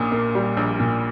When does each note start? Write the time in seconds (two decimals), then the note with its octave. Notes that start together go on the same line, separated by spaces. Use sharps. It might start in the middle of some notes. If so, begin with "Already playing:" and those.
Already playing: A#1 A#2 D6 D#6
0.12 A#3
0.35 G3
0.57 A#1
0.80 A#2